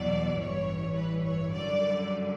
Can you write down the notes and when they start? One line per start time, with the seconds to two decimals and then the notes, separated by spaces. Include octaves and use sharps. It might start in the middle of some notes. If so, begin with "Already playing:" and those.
Already playing: E2 B2 F#3 D5
0.38 A1 G2 E3 C#5
0.95 B4
1.23 C#5
1.51 F#2 D3 G3 D5